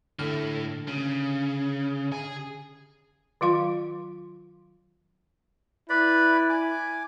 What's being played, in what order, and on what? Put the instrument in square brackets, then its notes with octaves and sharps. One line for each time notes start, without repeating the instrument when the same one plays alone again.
[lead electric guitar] A2 A3 [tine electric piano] D3 F6
[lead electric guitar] C#3
G#4
[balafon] D#3 F#3 F4 F5 C6
[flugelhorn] E4 [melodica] B4 D5 B5
[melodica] G#5 D6